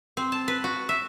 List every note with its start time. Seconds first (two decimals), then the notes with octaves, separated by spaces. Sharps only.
0.17 C4
0.32 A5
0.48 B4
0.64 F#4
0.89 E5